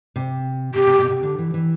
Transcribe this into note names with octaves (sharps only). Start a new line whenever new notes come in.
C3
C3 G4
C3
B2
C3
D3
E3
E3